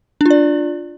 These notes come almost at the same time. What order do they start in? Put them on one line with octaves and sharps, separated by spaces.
D4 F4 D5